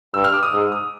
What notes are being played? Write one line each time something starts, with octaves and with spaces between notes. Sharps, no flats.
G2 E6
F6
D6
D#6
G#2
D#6